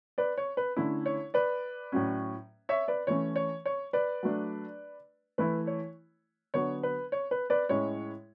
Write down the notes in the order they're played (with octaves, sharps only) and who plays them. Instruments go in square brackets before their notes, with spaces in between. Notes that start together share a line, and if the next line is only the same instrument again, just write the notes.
[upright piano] B4 D5
C#5
B4
D3 A3 C#4 E4
C#5
B4 D5
A2 F#3 C#4
C#5 E5
B4 D5
E3 A3 C#4 C#5
C#5
C#5
B4 D5
F#3 A3 D4
E3 A3 E4 B4
C#5
D3 F#3 B3 C#5
B4
C#5
B4
B4 D5
A2 G#3 C#4 E4 C#5